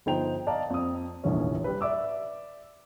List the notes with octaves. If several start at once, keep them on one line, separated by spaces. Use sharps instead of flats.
G1 F3 D#4 C5 G5 F7
D5 D#5 F5 A5 A#5
F2 D#6
F1 A#1 D#2 E3 C#4
G3 B4
D5 E5 D6 E6